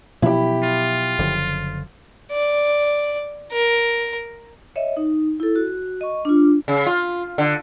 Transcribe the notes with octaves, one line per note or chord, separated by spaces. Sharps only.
B2 F3 F#3 E4 G4
F4
F#1 D3 F3
D5
A#4
C#5 D#5 E5
D#4
E4 A4
F#4
D#5 C#6
D4 F4
C#3
F4
D3